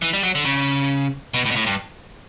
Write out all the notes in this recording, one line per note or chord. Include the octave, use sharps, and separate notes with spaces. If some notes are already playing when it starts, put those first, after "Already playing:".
E3
G3
F#3
D3
C#3
B2
A2
B2
A2
G2